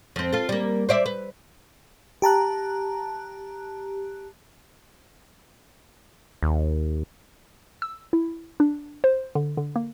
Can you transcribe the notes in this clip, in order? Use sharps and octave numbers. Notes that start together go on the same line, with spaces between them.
F2 C4
F4 A4
G3 A#3
C5 D5 E5
B4
G4 A5 A#5 F#6
D#2
E6
E4
D4
C5
D3
D3
A#3